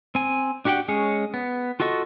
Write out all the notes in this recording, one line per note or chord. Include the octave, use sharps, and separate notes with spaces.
C4 G#5
D4 F#4 G4 F#5 G5
G#3 C#4 G#4 C#5
B3
F4 F#4 A4 D#5 C#6